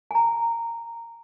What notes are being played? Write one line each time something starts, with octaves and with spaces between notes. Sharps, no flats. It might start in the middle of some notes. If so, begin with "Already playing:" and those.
G#5 A#5